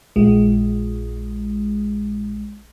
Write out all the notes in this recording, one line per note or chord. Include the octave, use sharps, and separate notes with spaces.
A#1 G#3